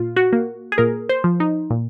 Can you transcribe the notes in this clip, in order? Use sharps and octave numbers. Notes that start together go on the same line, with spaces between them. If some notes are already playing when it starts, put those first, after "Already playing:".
Already playing: A#2 F4
F#4
A#3
G#4
A#2 A#4
C5
F3
D#4
A#2